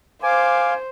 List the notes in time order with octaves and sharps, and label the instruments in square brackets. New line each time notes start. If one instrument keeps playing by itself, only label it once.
[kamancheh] C5 [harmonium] F5 [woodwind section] G#5 D6